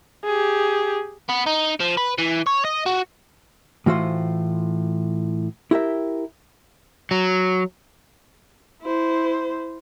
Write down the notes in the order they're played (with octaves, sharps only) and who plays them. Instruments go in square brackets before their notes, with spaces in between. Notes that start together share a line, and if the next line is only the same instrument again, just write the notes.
[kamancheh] G4 G#4
[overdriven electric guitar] B3
D#4
F3
B4
E3
C#5
D#5
F#4
[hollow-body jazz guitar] A2 E3 F4 F#4 C5
E4 G4 A#4 E5
[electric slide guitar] F#3
[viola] E4 C5